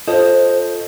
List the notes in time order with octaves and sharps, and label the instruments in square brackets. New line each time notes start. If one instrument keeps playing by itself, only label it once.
[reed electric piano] F4 A4 D#5 [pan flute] C5